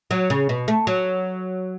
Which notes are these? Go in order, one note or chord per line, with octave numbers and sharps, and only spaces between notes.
F#3
C#3
B2
A3
F#3